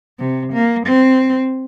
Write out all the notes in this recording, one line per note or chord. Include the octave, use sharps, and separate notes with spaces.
C3
A#3
C4